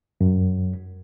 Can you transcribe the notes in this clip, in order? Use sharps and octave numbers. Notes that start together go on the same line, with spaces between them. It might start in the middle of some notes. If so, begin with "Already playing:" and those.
F#2